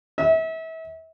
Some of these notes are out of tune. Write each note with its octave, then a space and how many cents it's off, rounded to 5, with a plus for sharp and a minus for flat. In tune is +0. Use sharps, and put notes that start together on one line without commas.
E5 -35